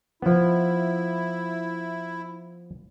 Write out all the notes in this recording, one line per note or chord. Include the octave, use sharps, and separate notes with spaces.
F3 B3 E4